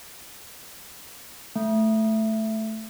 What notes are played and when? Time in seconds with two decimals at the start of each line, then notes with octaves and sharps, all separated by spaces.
1.56 A3